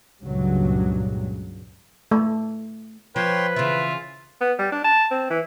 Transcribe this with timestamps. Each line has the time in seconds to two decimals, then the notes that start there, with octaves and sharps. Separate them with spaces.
0.22 C#2 G2 A#2 C#3 F#3
2.11 A3
3.16 F3 B4 C#5 G5 C6
3.56 C#3 E3 F4 E5
4.41 B3
4.59 G3
4.72 D4
4.84 A5
5.11 C4
5.30 E3